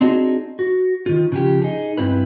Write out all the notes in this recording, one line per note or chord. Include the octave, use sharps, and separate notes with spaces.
C4 D4 D#4 F#4 G#4
F#4
D#3 F4
C#3 F3 G4
D#4 G#4
G2 C#3 C4 E4 B4